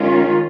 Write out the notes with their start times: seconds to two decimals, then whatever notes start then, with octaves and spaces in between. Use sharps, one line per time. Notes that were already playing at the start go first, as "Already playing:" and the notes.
Already playing: D#3 G#3 C#4 F4